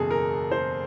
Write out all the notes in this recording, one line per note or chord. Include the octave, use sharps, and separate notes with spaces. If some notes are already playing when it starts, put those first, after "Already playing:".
Already playing: F#1 E2 B2 G#4 A4
A#4
C5